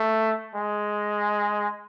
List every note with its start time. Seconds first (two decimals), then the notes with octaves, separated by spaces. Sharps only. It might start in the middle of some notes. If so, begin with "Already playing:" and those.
Already playing: A3
0.55 G#3